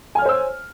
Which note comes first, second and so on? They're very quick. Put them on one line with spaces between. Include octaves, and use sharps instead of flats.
G#5 F6 C#5 C5 E6